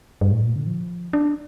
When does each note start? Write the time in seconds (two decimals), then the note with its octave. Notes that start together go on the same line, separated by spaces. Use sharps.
0.21 G2
0.32 A2
0.43 A#2
0.56 D3
0.67 F3
1.13 D4